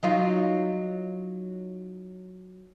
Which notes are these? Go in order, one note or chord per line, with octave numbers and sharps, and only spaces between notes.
F#3 D#4 F4